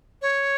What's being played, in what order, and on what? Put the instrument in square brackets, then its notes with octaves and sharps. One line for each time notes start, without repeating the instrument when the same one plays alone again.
[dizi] C#5